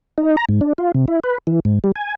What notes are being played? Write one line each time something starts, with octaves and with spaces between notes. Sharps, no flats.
D#4
A#5
G#2
D4
F4
C3
E4
B4
E3
G#2
G3
G#5